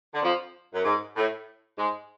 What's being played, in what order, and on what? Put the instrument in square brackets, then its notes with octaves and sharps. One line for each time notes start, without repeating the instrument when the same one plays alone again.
[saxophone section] D3
F2 F3
F#2
G#2
A2
G#2 G#3